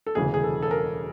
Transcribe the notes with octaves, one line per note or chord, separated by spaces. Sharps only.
A4
E1 D2 C#3 E3 G#4
G#4
A4
A4
A#4